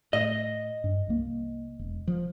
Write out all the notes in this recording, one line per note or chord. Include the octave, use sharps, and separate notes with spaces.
A2 D#5
G2
C2 A#3
E1
F3